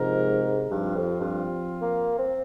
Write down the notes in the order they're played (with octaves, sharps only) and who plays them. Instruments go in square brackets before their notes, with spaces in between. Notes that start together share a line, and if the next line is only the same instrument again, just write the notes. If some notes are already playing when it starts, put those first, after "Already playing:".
Already playing: [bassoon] G#2 [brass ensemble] C3 F3 G#3 D#4 A#4
[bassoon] G2 [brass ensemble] F3 C4 F4
[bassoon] F2
G2
A#3
C4